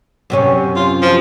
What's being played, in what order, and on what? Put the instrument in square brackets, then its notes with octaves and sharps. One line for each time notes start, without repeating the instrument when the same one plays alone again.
[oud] F#2 C3 C#4
[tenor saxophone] F4
F3